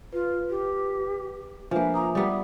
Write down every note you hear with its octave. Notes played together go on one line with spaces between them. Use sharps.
F4 B4
G4
F3 A#3 D4 B4 E5 G#5
E5 A#5 D6 D#6
G3 B3 G4